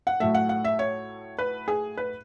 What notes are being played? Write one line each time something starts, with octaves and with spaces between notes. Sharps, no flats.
F#5
A2 F#3 A3 E5
F#5
F#5
E5
C#5
B4
G#4
B4